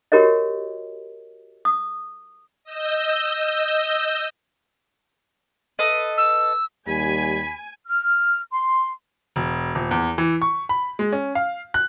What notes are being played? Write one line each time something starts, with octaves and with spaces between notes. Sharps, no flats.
F#4 G4 A#4 C#5 D#5
D#6
D#5 E6 G6
A4 B4 D#5
E6
D#2 G3 G#5 B5
F6
C6
E1
D#1
E2
E3
C#6
B5
G#3
C#4
F5
F#6